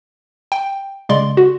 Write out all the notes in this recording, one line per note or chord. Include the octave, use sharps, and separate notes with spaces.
G5
C#3 G#3 D5 C6
F#4